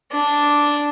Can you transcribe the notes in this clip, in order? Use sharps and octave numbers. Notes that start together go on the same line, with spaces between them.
D4